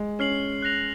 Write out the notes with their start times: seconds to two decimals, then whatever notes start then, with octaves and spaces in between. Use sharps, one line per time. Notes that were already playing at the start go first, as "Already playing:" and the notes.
Already playing: G#3
0.19 C#4 F6 C7 F#7
0.63 F#6 A#6 F7